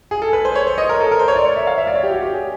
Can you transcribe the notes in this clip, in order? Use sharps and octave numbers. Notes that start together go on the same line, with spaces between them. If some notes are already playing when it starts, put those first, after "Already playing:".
G#4
A4
B4
C5
C#5
C5
D#5
A#4
A4
A#4
C5
C#5
D5
C#5
E5
F5
E5
D5
C#5
G4
F#4
G4
G#4